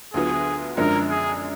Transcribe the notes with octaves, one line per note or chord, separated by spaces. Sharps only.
D2 D3 F#3 B3 F4 G#4
F#2 D3 F3 G#3 D4 A#4
G#4